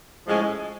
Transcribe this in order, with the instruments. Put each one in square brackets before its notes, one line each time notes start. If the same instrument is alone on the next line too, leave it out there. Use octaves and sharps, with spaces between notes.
[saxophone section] A2 F3 G#3 C#4